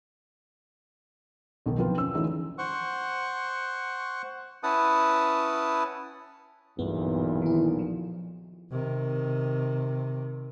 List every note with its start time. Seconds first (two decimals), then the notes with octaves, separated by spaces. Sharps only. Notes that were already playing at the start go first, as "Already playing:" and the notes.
1.66 B1 B2 D#3
1.78 F3 F#3 C4 F4 B4
1.97 C#4 E6
2.14 D3 E3 G#3 A3 D4 D#4
2.58 C5 F#5 C#6
4.63 C#4 E4 B4 F#5 A5 D#6
6.79 B1 E2 G2 A#2 B3
7.42 D#3 E4
7.79 F3
8.71 C3 D#3